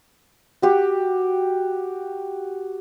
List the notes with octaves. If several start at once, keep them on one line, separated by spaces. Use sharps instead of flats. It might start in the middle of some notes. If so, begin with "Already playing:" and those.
F#4 G4